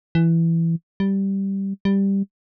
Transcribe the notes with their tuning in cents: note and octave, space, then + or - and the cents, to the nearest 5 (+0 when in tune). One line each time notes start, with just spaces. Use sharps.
E3 +10
G3 -5
G3 +5